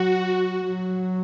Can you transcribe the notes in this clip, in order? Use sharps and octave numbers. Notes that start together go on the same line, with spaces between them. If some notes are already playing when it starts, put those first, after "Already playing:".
Already playing: F#3 F#4
F#3